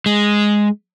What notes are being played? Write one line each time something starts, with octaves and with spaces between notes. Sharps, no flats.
G#3